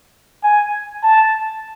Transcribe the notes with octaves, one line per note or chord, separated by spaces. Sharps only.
G#5
A5